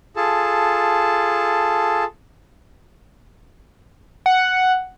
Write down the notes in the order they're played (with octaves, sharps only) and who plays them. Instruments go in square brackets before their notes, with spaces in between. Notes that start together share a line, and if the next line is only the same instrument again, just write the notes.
[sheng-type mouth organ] F4 G#4 A4 A5
[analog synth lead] F#5